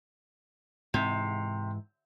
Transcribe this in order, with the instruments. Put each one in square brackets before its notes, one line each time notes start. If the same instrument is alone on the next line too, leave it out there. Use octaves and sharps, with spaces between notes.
[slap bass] G#2 E3 [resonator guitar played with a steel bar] C3